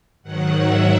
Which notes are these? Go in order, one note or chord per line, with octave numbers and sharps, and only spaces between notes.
G#2 D#3 F#3 F#5
E5